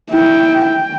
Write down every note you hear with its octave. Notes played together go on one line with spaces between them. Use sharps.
E4 G5
G5